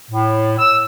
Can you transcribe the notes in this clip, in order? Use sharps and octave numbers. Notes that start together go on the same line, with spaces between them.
A2
E6